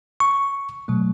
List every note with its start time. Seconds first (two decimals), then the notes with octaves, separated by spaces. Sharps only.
0.20 C#6
0.88 B2 F#3 A3